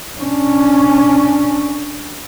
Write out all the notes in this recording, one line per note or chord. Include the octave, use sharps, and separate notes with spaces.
C#4 D4